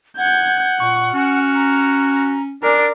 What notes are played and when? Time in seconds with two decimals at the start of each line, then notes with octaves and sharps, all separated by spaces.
0.18 F#5 G6 G#6
0.80 A#2 C#6
1.14 C#4 F#4 F6
1.55 A#5
2.63 D4 A#4 D5 G#5 A#5